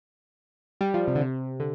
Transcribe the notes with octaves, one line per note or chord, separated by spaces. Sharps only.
G3
F3
C3
D3
C3
D3